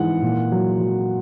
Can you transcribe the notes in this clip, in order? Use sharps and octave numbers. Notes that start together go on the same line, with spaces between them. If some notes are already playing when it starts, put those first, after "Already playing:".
Already playing: G#2 E3 F#5
A#2
F#3
F#3